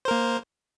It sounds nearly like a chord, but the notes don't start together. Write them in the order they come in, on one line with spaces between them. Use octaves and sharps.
C5 A#4 A#3